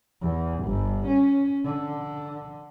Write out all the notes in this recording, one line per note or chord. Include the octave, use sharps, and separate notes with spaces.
E2
G1
C#4
D3